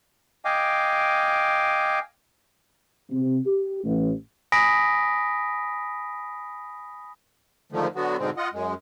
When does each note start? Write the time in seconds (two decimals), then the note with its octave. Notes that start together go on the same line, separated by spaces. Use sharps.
0.45 D#5 F5 G5 G#5 D6
3.10 C3
3.46 G4
3.84 A1
4.52 G#5 B5 D#6 A#6 B6 D7
7.72 G#2 D3 D#3 F3 A3
7.95 D3 F#3 B3 F#4
8.18 G#2 B2 D3 G#3 C4
8.37 F4 D#5 F#5
8.53 F#2 G#3